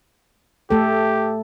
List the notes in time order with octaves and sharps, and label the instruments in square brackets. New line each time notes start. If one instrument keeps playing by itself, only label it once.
[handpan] A3 A4 [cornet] G4